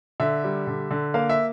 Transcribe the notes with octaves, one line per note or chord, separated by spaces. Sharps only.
D3 E5
G3
D3
D3
A#3 F5
E5